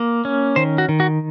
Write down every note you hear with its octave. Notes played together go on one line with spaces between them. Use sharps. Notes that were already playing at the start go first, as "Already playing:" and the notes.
Already playing: A#3
C#4
D#3 C5
F#4
D#3
F#4